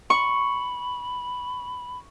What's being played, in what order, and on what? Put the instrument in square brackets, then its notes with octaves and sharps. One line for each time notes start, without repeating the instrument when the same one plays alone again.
[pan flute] B5 [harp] C#6